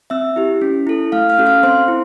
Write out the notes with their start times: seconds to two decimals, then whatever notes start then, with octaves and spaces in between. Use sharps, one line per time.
0.10 C4 E5 E6
0.36 E4 G4
0.62 C#4
0.87 E4 A4
1.12 A3 F5 F6
1.29 F5 F6
1.38 C#4 F#4 A4
1.46 F5 F6
1.63 C4 C5 C6
1.88 E4